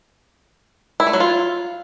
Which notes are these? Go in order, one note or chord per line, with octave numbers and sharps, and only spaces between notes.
E4
A3
F#3
F4